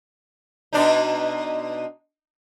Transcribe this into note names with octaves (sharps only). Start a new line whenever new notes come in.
B2 D4 D#4